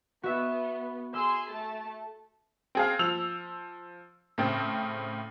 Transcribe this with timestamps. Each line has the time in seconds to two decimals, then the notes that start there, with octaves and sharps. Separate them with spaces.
0.23 B3 F#4 E5
1.14 G#4 C6 E6
1.50 A3 A5
2.75 C4 G#4 F5
2.99 F3 E6 F7
4.38 A2 C#3 C4